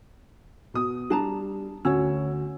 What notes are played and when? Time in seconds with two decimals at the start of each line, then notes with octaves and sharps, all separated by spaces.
0.74 B2 D#6
1.10 G3 D4 A5 A#5
1.85 D2 C#4 F#4 C#5 E6